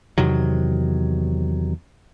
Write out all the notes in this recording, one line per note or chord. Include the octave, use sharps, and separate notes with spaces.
E2 C3 D#3 F#3